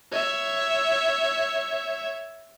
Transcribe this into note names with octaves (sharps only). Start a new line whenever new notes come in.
C#5 E5